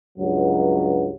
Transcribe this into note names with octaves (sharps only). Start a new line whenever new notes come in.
C#2 G2 F#3